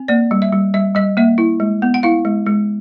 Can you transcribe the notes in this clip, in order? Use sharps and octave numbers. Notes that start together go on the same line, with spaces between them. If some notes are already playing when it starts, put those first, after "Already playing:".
Already playing: C4
A#3 D5
G3
E5
G3
G3 E5
G3 D#5
A#3 E5
E4
G#3
B3
F#5
E4 F5
G#3
G#3